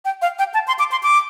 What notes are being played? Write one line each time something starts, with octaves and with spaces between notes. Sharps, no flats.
G5
F5
G5
A5
C6
D6
C6
D6